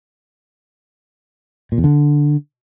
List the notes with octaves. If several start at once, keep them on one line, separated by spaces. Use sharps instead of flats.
A#2
E2
D3